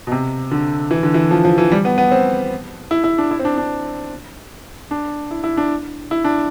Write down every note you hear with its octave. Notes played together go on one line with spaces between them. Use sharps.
B2
C3
D3
E3
D3
E3
F3
F3
E3
G3
B3
B3
C4
E4
E4
D4
E4
C4
D4
D4
D4
E4
E4
D4
E4
D4